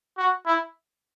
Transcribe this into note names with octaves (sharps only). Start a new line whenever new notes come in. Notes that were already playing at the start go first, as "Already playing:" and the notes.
F#4
E4